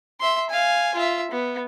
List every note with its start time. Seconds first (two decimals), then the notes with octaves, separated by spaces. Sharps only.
0.20 E5 C6
0.50 F5 G#5
0.95 F4 E5
1.31 B3